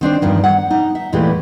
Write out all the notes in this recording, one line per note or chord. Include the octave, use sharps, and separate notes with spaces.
D#3 C4 D4 C5
E2 G2 D#3 F3
F#5
D#4
E5
E2 A#2 E3 G#3 A3 G4